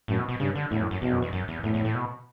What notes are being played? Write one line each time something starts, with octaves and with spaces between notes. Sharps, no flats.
F#2 A2
B2
B2
G2 C#3
D3
E2 A2
F#2
F#2
E2 B2
F#2
E2
F#2
E2
E2 A2
E2
A2
B2